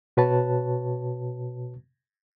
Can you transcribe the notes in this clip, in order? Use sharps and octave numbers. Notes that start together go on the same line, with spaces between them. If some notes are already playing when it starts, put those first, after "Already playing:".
B2 F#4 B4 C#5 A5